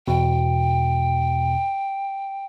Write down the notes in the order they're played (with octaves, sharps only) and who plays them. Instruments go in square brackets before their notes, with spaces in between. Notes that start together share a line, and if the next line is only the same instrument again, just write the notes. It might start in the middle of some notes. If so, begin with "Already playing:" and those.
[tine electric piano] E2 B2 [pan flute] G5